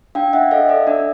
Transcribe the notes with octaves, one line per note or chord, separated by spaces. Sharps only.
D4 F5 G5
D4 E5 F#5
A4 D#5 F5
A4 D5 E5
D4 D5 E5